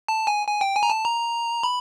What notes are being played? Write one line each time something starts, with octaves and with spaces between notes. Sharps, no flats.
A5
G#5
G#5
G5
G#5
A#5
A5
A#5
B5